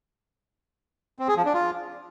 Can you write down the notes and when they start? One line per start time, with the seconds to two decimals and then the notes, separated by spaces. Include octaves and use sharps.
1.19 C4
1.28 G#4
1.37 F3
1.45 D4
1.54 F4